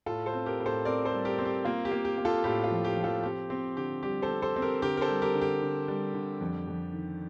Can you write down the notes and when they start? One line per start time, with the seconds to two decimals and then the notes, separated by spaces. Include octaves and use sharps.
0.06 A2 F4 A4
0.26 A4 C5
0.33 C4
0.46 G4 A#4
0.60 A2
0.66 A4 C5
0.85 C4 A#4 D5
1.05 A4 C5
1.12 G3
1.25 G4 A#4
1.39 C4
1.45 G4
1.65 A#3 F4
1.85 G4
1.92 A#3
2.05 G4
2.18 A#3
2.25 F4 A4
2.44 A2 G4
2.64 F4
2.71 F3
2.84 G4
2.97 F3
3.04 F4 A4
3.23 C4 G4
3.50 C4 G4
3.77 D3 G4
4.03 G3 G4
4.22 A4 C5
4.29 C4
4.42 A4 C5
4.56 C4
4.62 G4 A#4
4.82 D3 G4 A#4
4.97 A#4
5.01 A4 C5
5.08 G3
5.22 G4 A#4
5.35 D3
5.41 G4
5.62 D3
5.88 G3
6.14 D3
6.41 F2
6.67 F2
6.93 D#3